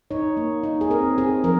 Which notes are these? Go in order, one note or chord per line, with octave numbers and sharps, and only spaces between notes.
D#4 C#5
A#3
D#4
G#4
C4 A#4
C4 G#4
F3 A#4